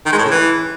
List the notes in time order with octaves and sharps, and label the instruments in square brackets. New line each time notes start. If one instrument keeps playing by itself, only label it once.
[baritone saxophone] D#3
G#3
A2
C#3
E3